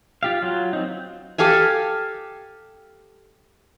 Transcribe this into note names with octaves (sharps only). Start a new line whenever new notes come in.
F4 G4 F5
F#3 F4
C4 D#4
G4 A4 F5 G#5